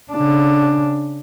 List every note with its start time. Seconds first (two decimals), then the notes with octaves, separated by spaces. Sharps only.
0.12 C#3 D4